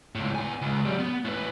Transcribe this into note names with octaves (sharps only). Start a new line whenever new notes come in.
C#2 A2
B3 G#5
C#2
F#3 G3
B3
A2 B4